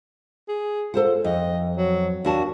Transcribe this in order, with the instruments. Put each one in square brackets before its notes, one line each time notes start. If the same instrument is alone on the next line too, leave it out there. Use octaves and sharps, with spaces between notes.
[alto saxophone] G#4
[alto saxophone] F4 [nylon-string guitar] A4 C5 F#5
[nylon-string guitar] F2 [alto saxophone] D#5
[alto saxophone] F#3
[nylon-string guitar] D#2 F#4 A5 [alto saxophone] D4